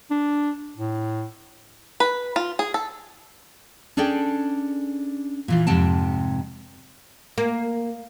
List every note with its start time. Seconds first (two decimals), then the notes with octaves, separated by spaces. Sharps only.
0.11 D4
0.77 A2
2.00 B4
2.36 F4
2.59 G#4
2.74 A4
3.97 C#4 D4 G#4 A4 D5 G5
5.48 A#2 E3 F4
5.67 F2 G#2 C3 G5 A5
7.38 A#3